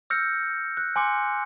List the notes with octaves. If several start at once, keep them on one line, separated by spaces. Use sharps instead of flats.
E6 F6 G6 A#6 C#7
F#6
G#5 C6 D6 C#7